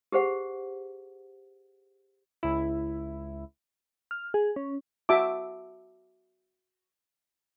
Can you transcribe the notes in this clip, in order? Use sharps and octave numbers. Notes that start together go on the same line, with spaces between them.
G4 G#4 C5 F#5
C#2 E4
F6
G#4
C#4
F#4 E5 A5 D6